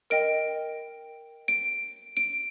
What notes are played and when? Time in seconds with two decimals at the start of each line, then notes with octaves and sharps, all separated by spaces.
0.10 A#4 D#5 G5 D7
1.48 D7
2.17 D7